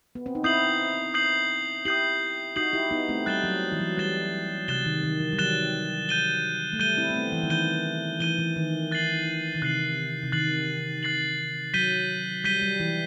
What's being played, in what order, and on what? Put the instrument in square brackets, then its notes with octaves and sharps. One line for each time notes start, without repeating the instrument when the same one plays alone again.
[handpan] B3
C4
D#4
[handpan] C4 E4 [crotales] D#6 G6 C7 F#7
[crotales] D#6 G6 C7 F#7
[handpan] E4 G4 [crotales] D#6 G6 C7 F#7
[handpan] D#4 F#4 [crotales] D#6 G6 C7 F#7
[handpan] E4 G4
B3 D#4
A3 C4
[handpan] G3 [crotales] F#6 A6 E7 G7
[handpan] F#3
E3
F#3
[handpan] G3 [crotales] F#6 A6 E7 G7
[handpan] C3 [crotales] F#6 A6 E7 G7
[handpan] D#3
D#3
E3
G3
[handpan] F#3 [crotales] F#6 A6 E7 G7
[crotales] G6 D#7 G7
[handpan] A3
[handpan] G3 [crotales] G6 D#7 G7
[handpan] C4 E4
B3
A3 C4
E3
D#3
[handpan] E3 [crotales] G6 D#7 G7
[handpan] E3 [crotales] G6 D#7 G7
[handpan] E3
D#3
[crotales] F#6 A6 C7 F#7
[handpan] D#3
[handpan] C3 [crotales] F#6 A6 C7 F#7
[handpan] C3
[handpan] D#3 [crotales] F#6 A6 C7 F#7
[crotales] F#6 A6 C7 F#7
[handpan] F#3 [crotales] G6 B6 D#7 G7
[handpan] G3 [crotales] G6 B6 D#7 G7
[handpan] G3
E3